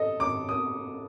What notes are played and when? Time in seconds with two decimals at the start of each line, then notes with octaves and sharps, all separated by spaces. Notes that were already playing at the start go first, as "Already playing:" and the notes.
Already playing: A4 D#5
0.20 D6
0.49 D#6